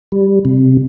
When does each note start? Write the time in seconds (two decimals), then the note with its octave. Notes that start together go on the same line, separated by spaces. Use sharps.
0.12 G3
0.45 C3